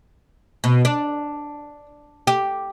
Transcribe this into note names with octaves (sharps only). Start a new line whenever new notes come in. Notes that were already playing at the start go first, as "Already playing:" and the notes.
B2
D4
G4